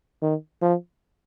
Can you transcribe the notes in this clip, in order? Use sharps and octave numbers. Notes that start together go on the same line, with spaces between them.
D#3
F3